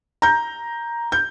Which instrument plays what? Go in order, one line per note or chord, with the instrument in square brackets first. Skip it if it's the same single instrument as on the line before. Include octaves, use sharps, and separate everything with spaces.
[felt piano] A#5 G6
G6